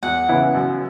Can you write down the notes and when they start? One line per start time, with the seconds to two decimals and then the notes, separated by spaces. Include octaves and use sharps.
0.03 E2 F#5
0.29 C#3 E3 B3 E4
0.55 F#2